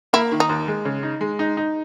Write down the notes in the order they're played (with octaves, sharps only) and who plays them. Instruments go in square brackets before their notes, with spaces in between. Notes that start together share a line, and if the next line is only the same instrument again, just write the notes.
[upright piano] A#3 [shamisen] E4
[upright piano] D#3
[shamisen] D#4
[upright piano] D#2
G#3
C#3
D#4
G#3
D#4
D#4